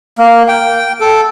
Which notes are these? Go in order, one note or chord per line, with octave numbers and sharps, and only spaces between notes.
A#3
G5
A4